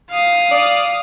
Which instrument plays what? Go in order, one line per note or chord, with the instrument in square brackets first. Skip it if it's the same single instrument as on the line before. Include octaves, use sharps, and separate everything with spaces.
[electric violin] F5 D#6
[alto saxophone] D5